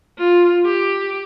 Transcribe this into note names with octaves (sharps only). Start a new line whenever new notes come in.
F4
G4